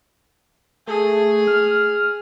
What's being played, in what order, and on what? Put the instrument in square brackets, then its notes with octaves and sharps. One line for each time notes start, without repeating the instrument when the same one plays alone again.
[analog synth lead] A3 [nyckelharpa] G#4
[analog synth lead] F6